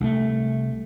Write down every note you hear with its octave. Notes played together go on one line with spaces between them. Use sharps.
C2 A3